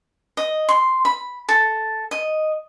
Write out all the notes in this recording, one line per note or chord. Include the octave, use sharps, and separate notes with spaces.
D#5
C6
B5
A4
D#5